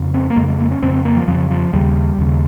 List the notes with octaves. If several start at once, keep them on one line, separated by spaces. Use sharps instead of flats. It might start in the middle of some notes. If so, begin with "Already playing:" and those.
Already playing: F2 C#3
C4
A#3
F2 C#3 G#3
G#3
A#3
C#4
F2 C#3 C4
C4
A#3
F3
F2 C#3 F3
F3
D#2 C#3 G3
D#2 C#3